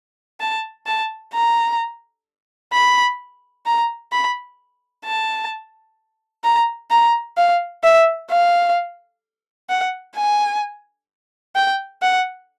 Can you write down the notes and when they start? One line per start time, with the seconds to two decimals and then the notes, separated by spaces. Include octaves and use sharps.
0.40 A5
0.87 A5
1.34 A#5
2.73 B5
3.66 A#5
4.12 B5
5.05 A5
6.44 A#5
6.91 A#5
7.37 F5
7.83 E5
8.30 F5
9.69 F#5
10.16 G#5
11.56 G5
12.02 F#5